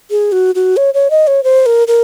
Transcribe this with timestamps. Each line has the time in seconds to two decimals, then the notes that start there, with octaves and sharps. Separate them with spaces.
0.11 G#4
0.32 F#4
0.55 F#4
0.77 C#5
0.94 C#5
1.10 D#5
1.27 C#5
1.44 C5
1.66 A#4
1.88 A#4